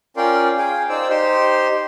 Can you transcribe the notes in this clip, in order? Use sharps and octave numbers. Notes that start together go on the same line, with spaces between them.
C#4 F4 A#4 D5 G5 C6
G#4 F5 G5
D#4 C5 D5 G5 E6
D#4 G4 C5 C6